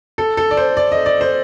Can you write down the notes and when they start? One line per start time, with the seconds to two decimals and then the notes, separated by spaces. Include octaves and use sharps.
0.18 A4
0.37 A4
0.51 D5
0.57 C5
0.77 D5
0.92 D#5
1.06 D5
1.21 C5